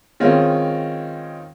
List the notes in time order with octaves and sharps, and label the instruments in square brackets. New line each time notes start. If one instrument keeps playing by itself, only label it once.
[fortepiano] D#3 G#3 C4 C#4 F4